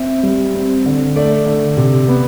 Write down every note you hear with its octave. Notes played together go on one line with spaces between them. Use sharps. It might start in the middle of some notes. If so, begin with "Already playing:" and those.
Already playing: C4 E5
G3
C4
D3
A3 D5
D3
C3
B3